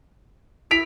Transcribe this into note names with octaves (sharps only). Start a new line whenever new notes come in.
E4 B6 D7 F7